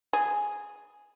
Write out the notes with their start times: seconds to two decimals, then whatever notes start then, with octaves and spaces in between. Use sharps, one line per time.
0.13 G#4